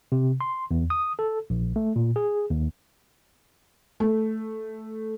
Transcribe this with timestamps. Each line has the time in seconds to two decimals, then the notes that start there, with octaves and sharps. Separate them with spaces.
0.12 C3
0.41 C6
0.71 E2
0.90 D#6
1.19 A4
1.50 A#1
1.76 A3
1.96 A#2
2.16 G#4
2.50 D#2
4.00 A3